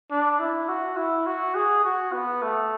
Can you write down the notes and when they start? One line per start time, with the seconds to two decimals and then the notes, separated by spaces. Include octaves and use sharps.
0.11 D4
0.39 E4
0.69 F#4
0.97 E4
1.26 F#4
1.55 G#4
1.84 F#4
2.13 B3
2.42 A3